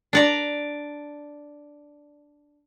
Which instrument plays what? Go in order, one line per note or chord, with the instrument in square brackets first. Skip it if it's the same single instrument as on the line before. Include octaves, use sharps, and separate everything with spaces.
[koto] D4 D5 A#5